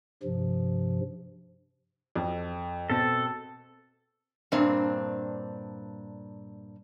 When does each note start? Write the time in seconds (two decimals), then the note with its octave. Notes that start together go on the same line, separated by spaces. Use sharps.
0.23 G2 C3 F3
2.16 F2
2.90 B2 C4 A4
4.52 G2 A#2 C4 D4